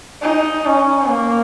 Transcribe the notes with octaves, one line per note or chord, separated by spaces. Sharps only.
D#4
C#4
A#3